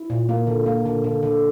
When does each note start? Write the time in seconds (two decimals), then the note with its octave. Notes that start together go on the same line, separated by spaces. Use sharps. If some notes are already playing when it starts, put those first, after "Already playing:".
Already playing: E4
0.10 A#2
0.29 A#3
0.47 D3
0.66 A#3
0.85 D3
1.04 D3
1.23 D3